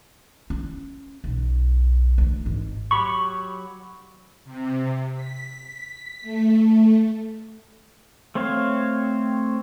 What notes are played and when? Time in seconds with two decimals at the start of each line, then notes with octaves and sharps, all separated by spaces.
0.50 C#4
1.24 B1
2.18 D2
2.46 G#1
2.91 F#3 G4 B5 C#6
4.45 C3
5.13 B6
6.22 A3
8.35 A3 C4 C5 C#5 F5